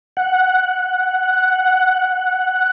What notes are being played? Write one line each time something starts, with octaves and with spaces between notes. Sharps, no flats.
F#5